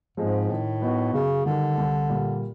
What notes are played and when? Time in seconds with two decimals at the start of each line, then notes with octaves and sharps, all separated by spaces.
0.17 G#2 F3 G#3 C4
0.49 A2 D#3
0.81 F#3 B3 D#4 F#4
1.13 F#2 C#3
1.45 D3 D#3 G3
1.77 C2
2.09 A#2 G3 A#3